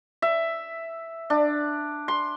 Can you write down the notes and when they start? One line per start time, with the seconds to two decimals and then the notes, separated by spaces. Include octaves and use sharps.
0.22 E5
1.30 D4
2.08 C6